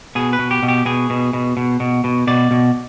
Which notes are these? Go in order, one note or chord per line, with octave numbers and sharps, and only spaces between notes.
B2 G#4
B4
B2
G4
B2
G4
B2 G#4
B2
B2
B2
B2
B2
B2 D5
B2